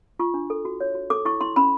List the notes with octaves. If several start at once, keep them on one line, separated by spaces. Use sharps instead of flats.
F4 C#6
D4
A4
F#4
C#5
F#4
A4 D6
E4 C#6
E4 C6
C#4 B5